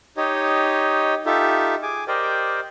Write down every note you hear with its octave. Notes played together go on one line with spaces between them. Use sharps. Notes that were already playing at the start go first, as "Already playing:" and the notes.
D#4 G4 C#5 D#5
D#4 F4 G4 A4 E5
G#4 G#5 D6
G4 A#4 C5 D5 D#5 G5